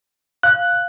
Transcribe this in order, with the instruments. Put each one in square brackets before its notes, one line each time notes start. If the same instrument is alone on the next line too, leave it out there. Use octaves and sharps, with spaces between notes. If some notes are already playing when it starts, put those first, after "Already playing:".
[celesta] F5 [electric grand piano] F#6